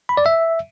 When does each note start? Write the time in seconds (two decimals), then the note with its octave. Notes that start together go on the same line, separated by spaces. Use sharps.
0.09 B5
0.17 D5
0.26 E5